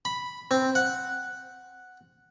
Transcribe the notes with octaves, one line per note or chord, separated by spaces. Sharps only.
B5
C4
F#5